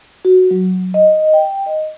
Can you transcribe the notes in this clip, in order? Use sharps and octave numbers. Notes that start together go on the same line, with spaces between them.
F#4
F#3
D#5
G5
D#5